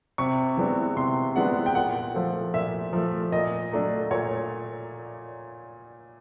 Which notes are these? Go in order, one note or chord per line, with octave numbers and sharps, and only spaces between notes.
C3 C#6
E3 G#3 B3 D4
C3 C6
E3 G#3 B3 D4 F#5
G5
A#2 F#5
F3 A3
A#2 E5
F3 A3
A#2 D#5
F#3 A3 D4
A#2 C#5